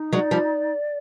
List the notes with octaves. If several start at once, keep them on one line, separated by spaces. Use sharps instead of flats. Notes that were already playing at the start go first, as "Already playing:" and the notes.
Already playing: D#4
F#3 G#3 D5
F3 G3